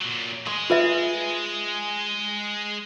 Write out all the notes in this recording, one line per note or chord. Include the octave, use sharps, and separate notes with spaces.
A#2 F#3
G#3 G#4 C6
F4 B4 E5